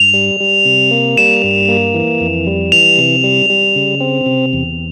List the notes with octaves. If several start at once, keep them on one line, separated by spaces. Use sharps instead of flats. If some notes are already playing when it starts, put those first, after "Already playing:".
Already playing: G2 F7
G3
G3
C3
A#3
G3 E7
G2
A#3
E3
F2
G3
E3 F7
C3
G3
G3
C#3
C4
C3
E2